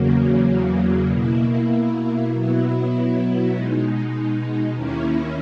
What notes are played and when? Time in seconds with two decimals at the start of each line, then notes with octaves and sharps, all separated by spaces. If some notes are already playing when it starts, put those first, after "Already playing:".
Already playing: E2 C#3 F#3 A#3
1.10 B2 A#3 E4
2.32 B2 F#3 B3 E4
3.53 B2 G#3 D#4
4.75 D#2 D#3 A#3 C#4 E4